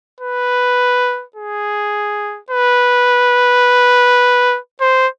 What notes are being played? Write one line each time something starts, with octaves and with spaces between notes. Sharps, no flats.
B4
G#4
B4
C5